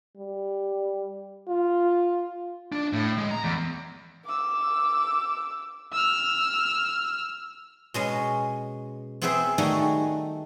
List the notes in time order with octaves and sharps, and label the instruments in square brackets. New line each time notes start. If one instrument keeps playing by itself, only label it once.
[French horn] G3
F4
[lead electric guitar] D4
A2
G#3
A#5
E2
[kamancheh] D6 E6
[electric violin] E6 F6
[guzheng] B2 G#3 C#4
B3 C4 G#4 B4 C5 E5
D#3 G3 A3 D#4 F#4 G#4